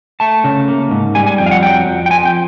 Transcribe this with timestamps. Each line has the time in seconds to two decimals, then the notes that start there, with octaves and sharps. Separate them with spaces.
0.20 A3 A5
0.44 C#3
0.68 A#3
0.91 G#2
1.15 G3 G#5
1.26 G#5
1.38 F2 G5
1.46 F5
1.51 F#5
1.62 F#3 G5
1.86 F2
2.06 G5
2.10 F3 G#5
2.25 G5